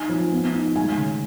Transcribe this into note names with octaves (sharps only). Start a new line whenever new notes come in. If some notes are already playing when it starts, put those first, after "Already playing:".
Already playing: D#4 G#5
F3
B3
D#4
G#3 G#5
C#3